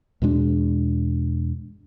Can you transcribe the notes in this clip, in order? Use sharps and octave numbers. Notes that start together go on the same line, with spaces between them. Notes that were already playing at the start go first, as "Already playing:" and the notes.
E2 B2 G#3 D4